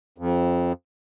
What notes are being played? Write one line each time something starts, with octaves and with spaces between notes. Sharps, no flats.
F2